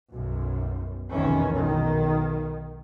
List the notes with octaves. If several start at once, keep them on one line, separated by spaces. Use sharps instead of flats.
B1 F#2
F1 B1 D#3 E3 C#4
B1 D#3